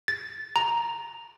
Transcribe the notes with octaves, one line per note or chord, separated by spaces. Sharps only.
A6
A#5